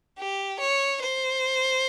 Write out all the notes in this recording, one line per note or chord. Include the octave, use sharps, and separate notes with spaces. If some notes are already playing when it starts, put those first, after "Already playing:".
G4
C#5
C5